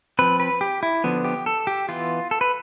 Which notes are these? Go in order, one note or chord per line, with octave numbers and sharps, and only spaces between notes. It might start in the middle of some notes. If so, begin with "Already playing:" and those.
F3 C4 B4
B4
G4
E4
D3 F3 B3
G4
A4
G4
E3 B3 F4
A4
B4